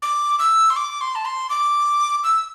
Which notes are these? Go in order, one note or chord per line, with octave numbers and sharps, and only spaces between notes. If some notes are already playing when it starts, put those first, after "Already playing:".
D6
E6
C6
D6
C6
A5
C6
D6
E6